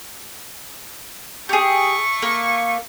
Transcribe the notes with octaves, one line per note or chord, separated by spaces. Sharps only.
A3 G4 G#4 C#6
A#3